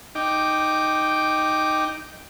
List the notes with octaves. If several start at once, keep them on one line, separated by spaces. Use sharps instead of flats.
D#4 G5 D6